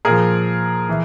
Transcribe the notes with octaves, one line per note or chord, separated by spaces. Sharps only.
A#2 F3 G#4 A#4
E3